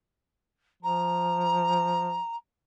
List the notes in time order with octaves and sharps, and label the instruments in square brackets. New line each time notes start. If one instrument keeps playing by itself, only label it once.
[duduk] F3 [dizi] A#5